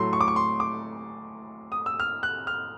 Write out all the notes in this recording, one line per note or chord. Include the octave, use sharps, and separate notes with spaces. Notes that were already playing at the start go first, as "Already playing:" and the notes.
Already playing: A2 F#3 A3 C6
C#6
D6
C#6
C6
D6
D#6
E6
F6
F#6
F6